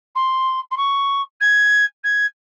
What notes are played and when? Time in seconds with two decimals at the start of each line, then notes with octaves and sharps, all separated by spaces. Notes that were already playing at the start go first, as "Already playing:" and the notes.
0.15 C6
0.71 C6
0.77 C#6
1.40 G#6
2.04 G#6